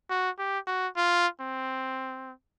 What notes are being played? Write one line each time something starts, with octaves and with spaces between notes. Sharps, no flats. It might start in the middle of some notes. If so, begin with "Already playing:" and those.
F#4
G4
F#4
F4
C4